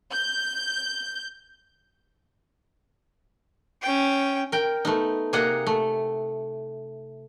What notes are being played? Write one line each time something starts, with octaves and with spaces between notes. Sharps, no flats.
G6
C#4 G5
A#4 G5
A3 B3 D#4
C3 A#3 G#4 D#5 F#5 A#5
A3